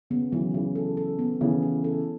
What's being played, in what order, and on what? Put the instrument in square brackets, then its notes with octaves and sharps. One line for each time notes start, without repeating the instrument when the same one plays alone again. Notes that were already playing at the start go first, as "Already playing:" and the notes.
[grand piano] C#3 [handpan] B3
[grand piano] C#3 E3 [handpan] F#3
[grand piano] C#3 E3 [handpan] F#3
[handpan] A4
A4
B3
[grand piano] C#3 E3 [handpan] B3
[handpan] E4
A4